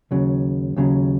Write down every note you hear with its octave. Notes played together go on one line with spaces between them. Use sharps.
D#2 C#3 F#3
D#2 C#3 F#3